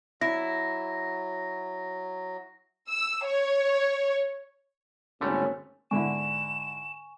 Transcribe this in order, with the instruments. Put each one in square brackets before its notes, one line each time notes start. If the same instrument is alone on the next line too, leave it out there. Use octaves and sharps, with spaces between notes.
[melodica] F#3 [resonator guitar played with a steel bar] E4 [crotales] A#6
[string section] E6
C#5
[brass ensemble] G#1 D#2 C#4 [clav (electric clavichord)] D3 G3 A3
[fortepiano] G#2 D3 E4 [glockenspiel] G#5 C#6 [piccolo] E7